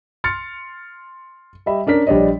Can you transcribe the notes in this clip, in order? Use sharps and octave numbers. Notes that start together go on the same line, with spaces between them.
C6 F6 A6 C#7
G3 G4 D#5 E5 B5
C#4 D4 A#4 B6
A#1 G3 D4 C#5 D#5